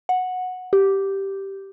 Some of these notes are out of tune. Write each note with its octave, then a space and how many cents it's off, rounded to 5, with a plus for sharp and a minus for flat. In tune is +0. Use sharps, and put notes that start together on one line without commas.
F#5 -10
G4 -5